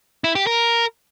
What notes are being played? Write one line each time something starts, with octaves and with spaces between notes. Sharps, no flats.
E4
G4
A#4